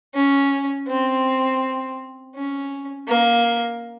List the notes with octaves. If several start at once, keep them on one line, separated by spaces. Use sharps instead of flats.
C#4
C4
C#4
A#3